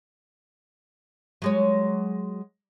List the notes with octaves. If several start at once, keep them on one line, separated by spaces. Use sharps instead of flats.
F#3 G#3 C#5